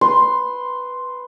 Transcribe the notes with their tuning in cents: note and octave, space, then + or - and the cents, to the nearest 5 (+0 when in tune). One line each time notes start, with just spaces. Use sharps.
B4 +0 C6 +0